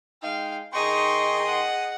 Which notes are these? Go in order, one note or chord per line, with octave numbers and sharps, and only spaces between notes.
G#3 D#4 F5 G5
D#3 D#4 G#4 D#5 G5 C6 C#6
F#5